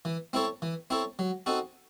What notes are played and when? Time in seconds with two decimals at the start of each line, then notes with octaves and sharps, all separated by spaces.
0.05 E3
0.33 C4 E4 A4 C#5
0.62 E3
0.90 C4 E4 A4 C#5
1.19 F#3
1.46 C4 D#4 F#4 A4